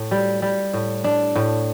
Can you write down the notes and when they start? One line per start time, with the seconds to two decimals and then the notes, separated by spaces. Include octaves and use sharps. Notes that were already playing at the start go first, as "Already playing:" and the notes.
Already playing: A2
0.11 G3
0.42 G3
0.74 A2
1.04 D4
1.36 A2